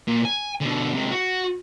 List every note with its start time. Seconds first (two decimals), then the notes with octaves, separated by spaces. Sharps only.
0.08 A#2
0.25 G#5
0.61 B2 D3
0.94 C3 G#3
1.12 F#4